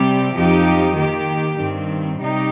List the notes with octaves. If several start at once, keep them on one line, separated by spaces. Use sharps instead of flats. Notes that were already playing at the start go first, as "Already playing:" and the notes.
Already playing: C3 G3 C4 G4
F2 F3 C4 D#4 G4
D#3 A#3 G4
G2 D#3 C4
C3 G3 D#4 G4